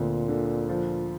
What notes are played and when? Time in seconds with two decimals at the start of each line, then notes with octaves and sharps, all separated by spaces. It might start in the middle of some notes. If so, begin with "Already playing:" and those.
Already playing: D2 A#2 C4
0.28 D3
0.69 F3